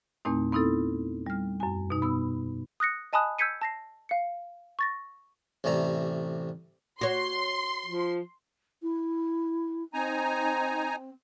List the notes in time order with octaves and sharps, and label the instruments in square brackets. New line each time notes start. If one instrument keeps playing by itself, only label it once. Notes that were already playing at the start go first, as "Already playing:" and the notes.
[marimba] E2 A#2 A3 C4 D#4
B3 C4 D#4 E4 A4
G3 F6
F#2 G#5
B2 D#4
B3 B5 D#6 E6
[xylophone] D#6 F#6 A#6 C#7
D#5 G#5 A5 B5 D#6 F#6
E6 G6 G#6 B6 C#7 D#7
A5 A#6 C7
F5 C#7
C#6 A6 A#6
[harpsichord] A1 C3 A3 D5 A#5
[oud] F#4 C#5 [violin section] C6
[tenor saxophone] F3
[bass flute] E4
[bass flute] C4 [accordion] D#4 G#5 A#5